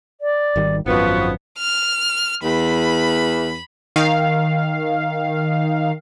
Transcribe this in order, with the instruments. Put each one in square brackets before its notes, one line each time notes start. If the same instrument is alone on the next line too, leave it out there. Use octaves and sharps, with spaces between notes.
[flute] D5
[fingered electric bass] G#1 D#3 G3
[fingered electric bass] G#1 F#2 [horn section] F3 B3 [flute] F#4
[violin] F6
[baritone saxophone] E2 [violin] B5
[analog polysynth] D#3 F5